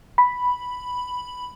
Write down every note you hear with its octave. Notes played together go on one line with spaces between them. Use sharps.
B5